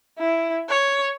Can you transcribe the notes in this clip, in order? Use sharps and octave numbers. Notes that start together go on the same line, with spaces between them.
E4
C#5